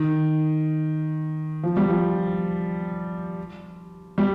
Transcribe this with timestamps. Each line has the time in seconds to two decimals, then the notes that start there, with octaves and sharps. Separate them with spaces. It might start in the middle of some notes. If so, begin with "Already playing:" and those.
Already playing: D#3
1.63 F3
1.77 G3
1.89 F3
4.18 G3